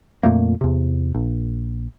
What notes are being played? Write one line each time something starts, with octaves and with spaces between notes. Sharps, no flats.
F2 A#2 A3 A#3
E2 C3
A#1